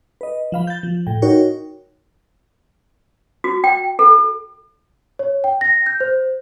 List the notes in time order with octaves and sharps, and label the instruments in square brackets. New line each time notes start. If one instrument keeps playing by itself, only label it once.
[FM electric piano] B4 D#5
F3 F5 B5
G6 A6
F3
A2 G5
D#4 F#4 A#4 C#5 G5 C#6
[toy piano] F#4
G5
A4
[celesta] C#5
G5
A#6
G6
C5